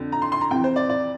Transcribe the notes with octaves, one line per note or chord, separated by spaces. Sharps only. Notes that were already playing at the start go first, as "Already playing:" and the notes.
Already playing: F2 D3
A#5
C6
C6
A#5
F2 C3 E3 G5
C5
D5
D5